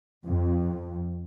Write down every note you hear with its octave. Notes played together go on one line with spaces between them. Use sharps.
F2